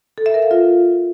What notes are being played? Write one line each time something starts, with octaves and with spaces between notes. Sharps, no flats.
A4
E5
A#4
F5
F4